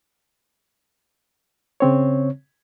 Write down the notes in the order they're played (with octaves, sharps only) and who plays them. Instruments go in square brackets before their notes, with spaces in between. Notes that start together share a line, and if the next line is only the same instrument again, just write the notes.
[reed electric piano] C#3 C4 C#5